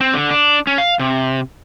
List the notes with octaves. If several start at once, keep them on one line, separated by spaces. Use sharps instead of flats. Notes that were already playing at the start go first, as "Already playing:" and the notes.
C4
D3
D4
C#4
F5
C3